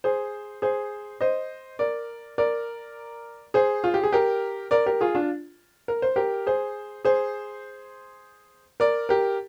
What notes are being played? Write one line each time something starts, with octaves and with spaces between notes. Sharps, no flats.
G#4 C5
G#4 C5
C5 D#5
A#4 D5
A#4 D5
G#4 C5
F4
G4
G#4
G4 A#4
A#4 D5
G4 A#4
F4 G#4
D4 F4
A#4
C5
G4 A#4
G#4 C5
G#4 C5
A#4 D5
G4 A#4